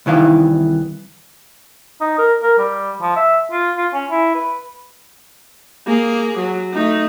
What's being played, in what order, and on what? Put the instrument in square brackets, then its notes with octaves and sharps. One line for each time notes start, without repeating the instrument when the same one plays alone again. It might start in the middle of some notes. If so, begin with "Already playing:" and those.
[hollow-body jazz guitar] C2 D#3 E3 F5
[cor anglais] D#4
A#4
A#4
G3
F3
E5
F4
F4
C#4
E4
B4
[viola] A#3 G#4
F#3
A3 D#4